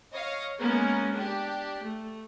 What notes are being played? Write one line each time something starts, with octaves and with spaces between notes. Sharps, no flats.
C#5 D#5 F5
G#3 A#3 B3 C#4 A#4
D4 G4
A3